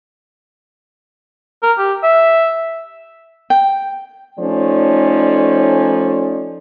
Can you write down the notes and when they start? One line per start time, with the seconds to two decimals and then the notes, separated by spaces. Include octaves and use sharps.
1.63 A#4
1.78 G4
2.03 E5
3.50 G5
4.39 F3 A3 C#4 D#4 C#5 D5